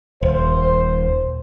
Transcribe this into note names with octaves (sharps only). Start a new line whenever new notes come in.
D#1 C5